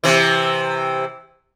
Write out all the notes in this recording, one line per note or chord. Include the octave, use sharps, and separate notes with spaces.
C3 E3